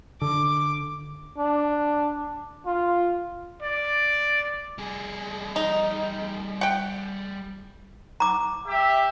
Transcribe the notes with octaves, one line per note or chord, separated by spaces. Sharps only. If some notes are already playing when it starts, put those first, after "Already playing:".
D3 D6
D4
F4
D5
G3 G#4
D#4
F#5 G5
A#5 D6
G4 E5